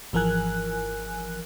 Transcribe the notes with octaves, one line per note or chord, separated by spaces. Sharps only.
G#1 E3 F3 A#4 G#5 F#6